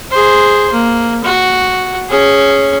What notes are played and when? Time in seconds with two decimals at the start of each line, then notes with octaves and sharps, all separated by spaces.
0.11 G#4 C5
0.72 A#3
1.24 F#4
2.09 C#4 G#4